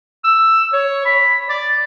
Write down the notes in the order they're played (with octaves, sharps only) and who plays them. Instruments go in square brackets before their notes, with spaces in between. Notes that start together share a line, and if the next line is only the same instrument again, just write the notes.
[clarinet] E6
C#5
B5
D5